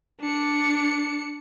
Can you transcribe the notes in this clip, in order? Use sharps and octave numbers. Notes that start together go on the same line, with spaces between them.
D4 C#7